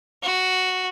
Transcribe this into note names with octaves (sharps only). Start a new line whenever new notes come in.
F#4